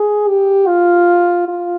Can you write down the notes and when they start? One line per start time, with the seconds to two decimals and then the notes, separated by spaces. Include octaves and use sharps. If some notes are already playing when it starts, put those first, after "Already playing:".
Already playing: G#4
0.28 G4
0.67 F4
1.48 F4